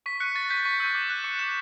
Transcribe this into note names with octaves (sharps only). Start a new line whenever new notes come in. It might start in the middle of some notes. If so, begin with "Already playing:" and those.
C#6 B6
F#6 C#7
C#6 A6
G6 B6
C#6 B6
E6 G6
D6
F#6
D6 C#7
F#6 E7